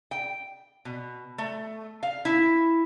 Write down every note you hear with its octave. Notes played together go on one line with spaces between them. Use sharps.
G5
B2
A3
F5
E4